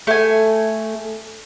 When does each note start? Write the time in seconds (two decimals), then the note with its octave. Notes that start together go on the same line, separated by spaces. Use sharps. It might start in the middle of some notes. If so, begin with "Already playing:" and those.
0.07 A3 G#5